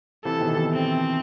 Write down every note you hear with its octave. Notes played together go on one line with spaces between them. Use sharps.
C3 E3 A4
B2 D#3
C3 E3
C4